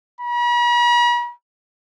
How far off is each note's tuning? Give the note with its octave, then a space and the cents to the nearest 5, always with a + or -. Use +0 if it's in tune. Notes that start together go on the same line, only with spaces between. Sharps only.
B5 -45